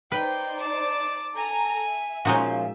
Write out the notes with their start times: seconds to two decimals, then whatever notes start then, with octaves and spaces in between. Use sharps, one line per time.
0.12 D#4 B4 C5 D5 G5
0.59 A5 D6
1.36 A4 G#5 A#5
1.87 E5
2.25 A#2 F3 G#3 C#4 D#4 F#4 E5